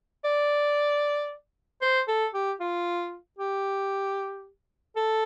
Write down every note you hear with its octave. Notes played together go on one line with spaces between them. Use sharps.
D5
C5
A4
G4
F4
G4
A4